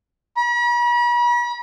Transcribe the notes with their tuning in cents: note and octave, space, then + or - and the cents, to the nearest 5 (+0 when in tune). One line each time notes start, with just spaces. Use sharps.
B5 -45